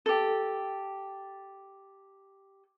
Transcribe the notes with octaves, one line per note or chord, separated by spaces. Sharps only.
G4 A4